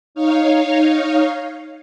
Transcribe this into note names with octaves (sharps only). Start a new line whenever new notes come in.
D#4 C#5 F5